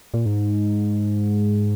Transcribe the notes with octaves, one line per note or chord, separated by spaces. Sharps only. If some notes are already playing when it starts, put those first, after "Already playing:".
A#2
G#2